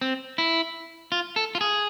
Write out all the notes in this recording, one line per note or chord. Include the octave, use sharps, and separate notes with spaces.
C4
E4
F4
A4
F4
G#4